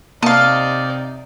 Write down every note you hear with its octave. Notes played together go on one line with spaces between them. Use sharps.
C3 A#3 D#4 D5 D#5 F5 A5